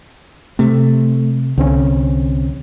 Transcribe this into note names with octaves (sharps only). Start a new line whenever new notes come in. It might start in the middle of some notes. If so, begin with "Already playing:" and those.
C3 A3
C2 D3 C4 C#4